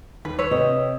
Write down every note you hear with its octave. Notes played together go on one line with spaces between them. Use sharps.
D#2 B4
B4 C#5 E6
C3 D#5